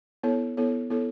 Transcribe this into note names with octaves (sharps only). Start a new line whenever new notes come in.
B3 E4 A4 C#5
B3 E4 A4 C#5
B3 E4 A4 C#5